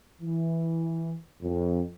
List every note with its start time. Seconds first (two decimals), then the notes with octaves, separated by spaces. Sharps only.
0.22 E3
1.42 F2